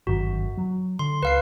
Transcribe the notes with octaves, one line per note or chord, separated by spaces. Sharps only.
G1 F#2 D#3 F#4
F#3
D3 C6
C#2 B4 F5 C7